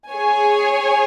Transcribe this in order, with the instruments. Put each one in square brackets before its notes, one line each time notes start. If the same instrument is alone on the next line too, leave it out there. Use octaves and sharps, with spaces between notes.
[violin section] G#4 C#5 G#5